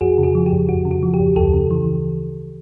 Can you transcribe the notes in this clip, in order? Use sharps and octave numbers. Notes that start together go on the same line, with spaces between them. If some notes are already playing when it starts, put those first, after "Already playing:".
F2 F#4 G#4
C#3
F#4 G#4
F3
G4
F2
F2 F#4
C#3
F#4
F3
G4
F2
D2 G4 A4
C#3
E3